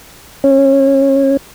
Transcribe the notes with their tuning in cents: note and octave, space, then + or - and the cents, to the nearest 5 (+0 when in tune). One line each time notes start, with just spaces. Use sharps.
C#4 -25